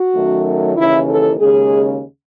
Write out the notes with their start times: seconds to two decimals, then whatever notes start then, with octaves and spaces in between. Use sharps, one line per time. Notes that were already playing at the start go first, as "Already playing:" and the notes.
Already playing: F#4
0.14 F#2 D#3 F#3 A3
0.77 D#2 C#3 E3 E4
1.08 A4
1.39 D#2 C#3 G#3 G#4